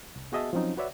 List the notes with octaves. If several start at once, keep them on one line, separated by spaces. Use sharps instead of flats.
C2
B3 F#4 G#4 D#5 E5 A5
F3 F#3 C4 C#4 D#4
F#4 B4 C#5 D5 E5 F#5